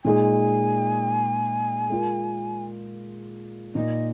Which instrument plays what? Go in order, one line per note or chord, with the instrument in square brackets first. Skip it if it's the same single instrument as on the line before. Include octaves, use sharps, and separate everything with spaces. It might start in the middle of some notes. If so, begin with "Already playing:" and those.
[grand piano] A#2 G#3 D#4 G#4 [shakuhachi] G#5
[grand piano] G#3 F4 A#4
[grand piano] A#2 A#3 D#4 [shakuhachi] D#5